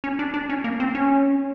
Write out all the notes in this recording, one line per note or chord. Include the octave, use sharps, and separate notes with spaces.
C#4
D4
D4
C#4
A#3
C4
C#4